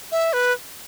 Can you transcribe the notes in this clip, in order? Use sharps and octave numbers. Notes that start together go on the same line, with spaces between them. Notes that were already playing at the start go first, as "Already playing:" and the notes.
E5
B4